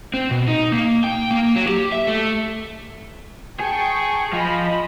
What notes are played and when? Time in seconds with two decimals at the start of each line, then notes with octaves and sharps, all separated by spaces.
0.14 C4
0.30 B2
0.48 D#4
0.72 A#3
1.04 G5
1.31 A#3
1.56 F#3
1.68 G4
1.92 E5
2.07 A3
3.60 G#4 G5 A5 C#6
4.33 F3 D#5 B5